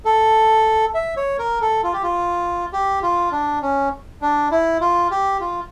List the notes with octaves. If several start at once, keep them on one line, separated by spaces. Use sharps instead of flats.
A4
E5
C#5
A#4
A4
F4
G4
F4
G4
F4
D4
C#4
D4
E4
F4
G4
F4